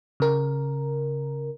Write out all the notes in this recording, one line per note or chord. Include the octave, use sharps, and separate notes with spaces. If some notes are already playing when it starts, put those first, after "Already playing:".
C#3 A#4